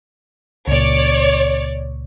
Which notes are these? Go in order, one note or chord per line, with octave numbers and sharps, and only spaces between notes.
C#2 A#2 C#5 D5